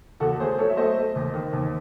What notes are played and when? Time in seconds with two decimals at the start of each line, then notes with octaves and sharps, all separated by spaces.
0.20 D#2 F#4 A4
0.40 A3 G#4 C5
0.58 F#3 A4 C#5
0.70 E5
0.77 A3 C5 D#5
0.97 A3
1.16 D#2
1.34 D#3
1.53 D#2